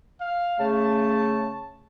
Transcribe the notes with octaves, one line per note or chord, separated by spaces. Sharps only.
F5
C#3 A3 A5